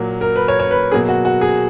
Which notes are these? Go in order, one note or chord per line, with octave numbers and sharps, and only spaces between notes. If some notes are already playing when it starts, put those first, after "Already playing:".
Already playing: A#2 F#3 A#3
A#4
B4
C#5
C#5
B4
B2 F#3 A#3 G#4
F#4
F#4
G#4